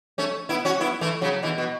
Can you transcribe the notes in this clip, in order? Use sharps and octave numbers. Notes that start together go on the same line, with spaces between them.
A3 C#4
B3 E4
C#4 F#4
B3 E4
E3 A3
C#3 F#3
B2 E3
B2